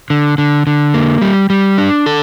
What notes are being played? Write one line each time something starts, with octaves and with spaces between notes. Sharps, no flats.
D3
D3
D3
A#3
G3
G3
D4
A4